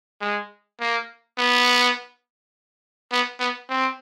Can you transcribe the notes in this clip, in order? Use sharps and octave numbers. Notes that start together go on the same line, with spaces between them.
G#3
A#3
B3
B3
B3
C4